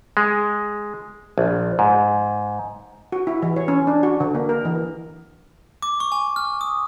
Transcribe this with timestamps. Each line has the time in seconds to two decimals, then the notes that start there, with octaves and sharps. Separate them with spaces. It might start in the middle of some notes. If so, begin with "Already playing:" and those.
0.17 G#3
1.38 A#1
1.79 G#2
3.12 F#4
3.27 E4
3.43 E3
3.56 C#5
3.68 C#4
3.87 D4
4.03 F#4
4.20 D3
4.35 A#3
4.49 A#4
4.65 E3
5.82 D6
6.00 C#6
6.12 G#5
6.36 F6
6.61 D#6